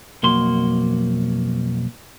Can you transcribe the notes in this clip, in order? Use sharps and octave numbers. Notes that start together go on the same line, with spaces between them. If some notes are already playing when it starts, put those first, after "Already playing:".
B1 F2 A#3 F#4 C6